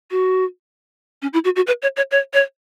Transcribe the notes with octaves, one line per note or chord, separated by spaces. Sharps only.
F#4
C#4
E4
F#4
F#4
B4
C#5
C#5
C#5
C#5